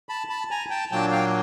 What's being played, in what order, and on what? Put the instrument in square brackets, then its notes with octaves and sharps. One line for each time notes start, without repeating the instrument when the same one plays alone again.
[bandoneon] A5 B5
A5 B5
G#5 A#5
G5 A5
A#2 F#3 A#3 D4 G5 A5
F5 G5